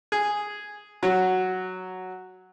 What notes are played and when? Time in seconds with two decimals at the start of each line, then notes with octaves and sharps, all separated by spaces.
0.12 G#4
1.03 F#3